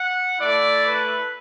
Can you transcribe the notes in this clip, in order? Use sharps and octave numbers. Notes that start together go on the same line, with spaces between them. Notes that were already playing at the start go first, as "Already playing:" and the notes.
Already playing: F#5
A3 E4 D5
B4